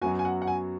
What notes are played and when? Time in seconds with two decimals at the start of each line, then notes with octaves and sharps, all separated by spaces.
0.01 F#2 F#3 B3 F#4 G#5
0.19 G#5
0.25 F#5
0.42 F#5
0.47 G#5